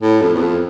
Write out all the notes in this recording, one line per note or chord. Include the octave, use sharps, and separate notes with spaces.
A2
F2
E2
F2